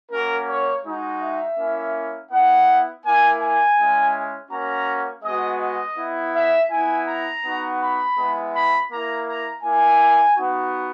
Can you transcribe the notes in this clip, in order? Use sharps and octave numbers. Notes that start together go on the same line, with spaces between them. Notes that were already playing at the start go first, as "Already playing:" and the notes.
A#3 C#4 F#4 A#4
C#5
G#3 D#4 F#4
E5
A#3 C#4 E4
B3 E4 F#5
A#3 E4 G#5
G#5
G#3 C#4 E4
A#3 C#4 F#4 A#5
G#3 B3 F#4 D#5
D#5
B3 E4
E5
B3 E4 G#5
A#5
B3 D#4 F#4
B5
G#3 B3 E4
B5
A#3 E4 A#5
A#5
A#3 E4 G#5
B3 D#4 F#4